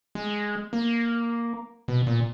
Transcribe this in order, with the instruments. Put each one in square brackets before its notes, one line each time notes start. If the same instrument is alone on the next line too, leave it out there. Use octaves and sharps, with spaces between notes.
[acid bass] G#3
A#3
B2
A#2